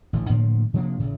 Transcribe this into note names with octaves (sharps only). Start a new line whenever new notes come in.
A1 D3
A2 D3 F3 A#3
C3 F3 A#3 D4
A1 C#3